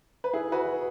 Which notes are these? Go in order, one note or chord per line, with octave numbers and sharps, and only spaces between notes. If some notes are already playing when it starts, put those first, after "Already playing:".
B4
E4 G#4
F#4 B4